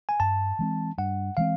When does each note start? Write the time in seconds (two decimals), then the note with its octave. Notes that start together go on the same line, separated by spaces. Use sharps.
0.09 G#5
0.20 G2 A5
0.59 E3 G#3 C4
0.98 G2 F#5
1.37 E3 G#3 C4 F5